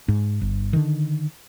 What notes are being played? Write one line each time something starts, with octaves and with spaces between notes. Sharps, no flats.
G#2
G1
D3 D#3